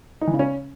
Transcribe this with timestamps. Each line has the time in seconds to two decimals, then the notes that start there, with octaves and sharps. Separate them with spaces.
0.21 D#4
0.27 E3
0.33 C#3
0.39 C#4